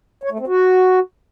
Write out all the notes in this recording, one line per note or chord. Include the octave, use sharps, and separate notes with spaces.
C#5
A3
C4
F#4